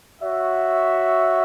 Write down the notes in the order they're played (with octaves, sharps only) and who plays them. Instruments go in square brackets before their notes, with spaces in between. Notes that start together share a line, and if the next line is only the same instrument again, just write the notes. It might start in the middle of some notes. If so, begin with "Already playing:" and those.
[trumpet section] F#4 C#5 E5